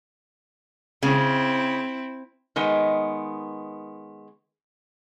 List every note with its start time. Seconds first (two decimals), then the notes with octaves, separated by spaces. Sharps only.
1.03 C#3 C4 E4
2.56 D#3 G#3 B3 D#5